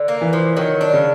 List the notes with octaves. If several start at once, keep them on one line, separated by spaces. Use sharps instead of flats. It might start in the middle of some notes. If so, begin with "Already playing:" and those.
Already playing: D3
A#3
E3
F3
D#3 F#3
D4
C#3